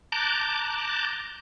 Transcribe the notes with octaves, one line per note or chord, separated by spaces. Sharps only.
A5 A#5 D6 F#6 G6